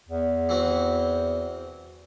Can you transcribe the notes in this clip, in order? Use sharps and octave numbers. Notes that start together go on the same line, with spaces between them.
E2
E3 C4 F#4